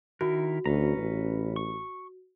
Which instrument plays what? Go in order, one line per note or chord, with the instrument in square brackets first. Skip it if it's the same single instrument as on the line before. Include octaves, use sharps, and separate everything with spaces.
[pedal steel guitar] D#3 E4 A#4 [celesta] F#4
[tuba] D2 [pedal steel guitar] C#4 B4 A#5
[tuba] A1
[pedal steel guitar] C#6